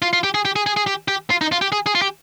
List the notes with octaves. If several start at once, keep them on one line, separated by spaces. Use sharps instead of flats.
F4
F4
G4
G#4
G4
G#4
G#4
G#4
G4
G4
F4
D#4
F4
G4
G#4
G#4
F4
G4